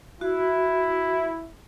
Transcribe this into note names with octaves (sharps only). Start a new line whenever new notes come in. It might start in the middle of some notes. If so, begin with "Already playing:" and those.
E4 F#4